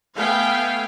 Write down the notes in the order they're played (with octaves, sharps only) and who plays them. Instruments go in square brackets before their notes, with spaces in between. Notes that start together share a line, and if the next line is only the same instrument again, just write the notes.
[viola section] A3 B3 F5 G5 G#5